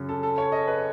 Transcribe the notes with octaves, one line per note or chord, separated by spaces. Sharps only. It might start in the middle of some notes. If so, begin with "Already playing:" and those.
Already playing: F#2 C#3
A4
A4
C#5
D#5
B4